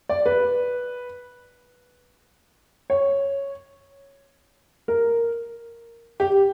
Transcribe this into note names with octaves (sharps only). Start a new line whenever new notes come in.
D5
B4
C#5
A#4
G4